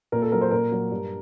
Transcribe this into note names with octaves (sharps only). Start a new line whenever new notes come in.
A#2 A#4
A4
F#3 A#4
C5
A#2 A#4
F#3
G2